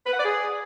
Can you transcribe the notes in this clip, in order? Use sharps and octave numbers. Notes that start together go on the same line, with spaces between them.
B4
F#5
D5
G#4